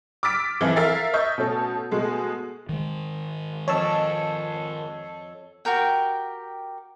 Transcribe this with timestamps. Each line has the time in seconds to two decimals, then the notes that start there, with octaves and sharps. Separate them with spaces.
0.23 D6 E6 F6 A6 B6 D7
0.60 F2 E3 F3 E4 F4
0.76 A#4 E5 F5 F6 A6
1.13 D#5 E5 C#6 G6
1.38 B2 A3 C#4 A4
1.91 B2 G#3 A3
2.69 D#3 G#3
3.68 F2 C#5 A5 E6
5.65 F#4 G4 A#4 G5